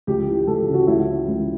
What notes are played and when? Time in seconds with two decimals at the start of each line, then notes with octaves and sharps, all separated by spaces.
0.07 C#2 G4
0.28 E3
0.47 C#2 A4
0.61 G4
0.67 C#3
0.74 F#4
0.87 C#2 E4
1.08 E3
1.28 C#2